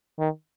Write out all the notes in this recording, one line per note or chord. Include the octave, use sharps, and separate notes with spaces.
D#3